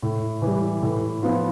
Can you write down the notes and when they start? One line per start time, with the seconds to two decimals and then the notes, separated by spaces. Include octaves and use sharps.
0.02 A2
0.42 E3
0.47 G3
0.82 A2
1.23 F3 B3 F4